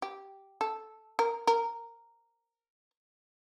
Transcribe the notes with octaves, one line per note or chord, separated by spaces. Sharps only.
G4
A4
A#4
A#4